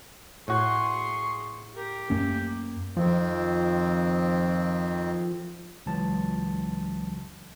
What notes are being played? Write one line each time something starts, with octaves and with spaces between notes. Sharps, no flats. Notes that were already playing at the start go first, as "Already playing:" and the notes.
A2 F#4 G#4 C6 C#6
G4 A#4
F#2 A3 A#3 C#4
F2 D#3 F3 C4
C#2 E3 F#3 A5